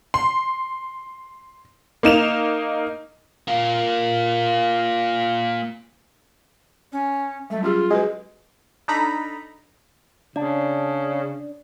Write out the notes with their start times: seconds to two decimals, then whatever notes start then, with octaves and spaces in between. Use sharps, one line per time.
0.14 C6
2.03 A#3 D#4 E7 F7
3.48 A#3 F4
6.92 C#4
7.50 F#3 G3 A3
7.63 C#4 F4 G4 G#4
7.90 G#3 F#4 A4 B4
8.88 D4 D#4 A4 A#5 B5
10.36 C#3 D4 D5